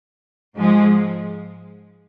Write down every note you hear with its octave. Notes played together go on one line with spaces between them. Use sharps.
G#2 F3 G#3